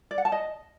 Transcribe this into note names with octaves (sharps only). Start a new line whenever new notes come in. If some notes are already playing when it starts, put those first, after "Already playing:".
D5
F#5
A5
D#5